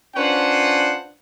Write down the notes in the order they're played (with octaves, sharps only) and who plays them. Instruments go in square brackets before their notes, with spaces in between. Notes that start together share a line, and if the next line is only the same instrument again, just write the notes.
[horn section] C#4 D4 F4 B4 C5 F#5